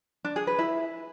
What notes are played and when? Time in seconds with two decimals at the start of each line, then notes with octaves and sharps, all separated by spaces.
0.25 D4
0.36 G#4
0.47 B4
0.59 E4